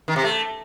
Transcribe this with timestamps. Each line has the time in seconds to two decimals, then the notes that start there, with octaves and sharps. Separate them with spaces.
0.08 D#3
0.16 C3
0.24 A3